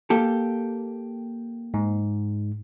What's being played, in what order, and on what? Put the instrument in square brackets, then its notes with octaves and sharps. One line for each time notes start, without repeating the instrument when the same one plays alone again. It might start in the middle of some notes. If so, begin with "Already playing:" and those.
[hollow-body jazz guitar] A#3 G4 A4
[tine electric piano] G#2